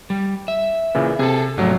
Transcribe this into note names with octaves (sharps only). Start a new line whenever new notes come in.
G3
E5
A#2 C#3 E3
C3 G#4 A4
A#1 G#2 C3 F#3 A3